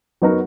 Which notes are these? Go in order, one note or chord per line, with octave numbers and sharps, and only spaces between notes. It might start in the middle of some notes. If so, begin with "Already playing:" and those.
F#3 B3 D#4 F#4 A#4